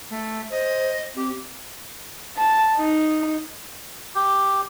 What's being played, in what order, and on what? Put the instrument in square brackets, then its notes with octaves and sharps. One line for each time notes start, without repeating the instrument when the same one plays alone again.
[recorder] A3
[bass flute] C5 [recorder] D#5
[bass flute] C4 [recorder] G4
[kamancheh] A5
D#4
[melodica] G4